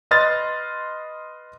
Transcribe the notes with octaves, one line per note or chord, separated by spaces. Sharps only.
B4 D#5 C6 F6 A6